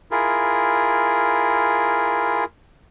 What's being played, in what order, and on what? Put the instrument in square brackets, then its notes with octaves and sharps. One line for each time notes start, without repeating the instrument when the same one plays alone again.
[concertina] E4 F4 G#4 A#4